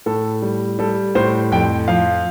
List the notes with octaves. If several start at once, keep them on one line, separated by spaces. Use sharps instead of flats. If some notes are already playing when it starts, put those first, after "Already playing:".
A2 A4
G3
G3 A4
A2 C5
F2 G5
F3 F5